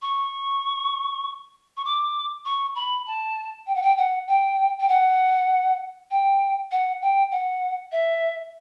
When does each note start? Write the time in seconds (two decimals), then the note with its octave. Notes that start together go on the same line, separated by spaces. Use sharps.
0.02 C#6
1.77 C#6
1.85 D6
2.45 C#6
2.75 B5
3.07 A5
3.67 G5
3.75 F#5
3.82 G5
3.98 F#5
4.27 G5
4.80 G5
4.89 F#5
6.11 G5
6.71 F#5
7.02 G5
7.31 F#5
7.92 E5